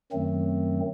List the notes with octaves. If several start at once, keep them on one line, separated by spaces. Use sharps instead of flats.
F#2 D#3 F#3 A3 C4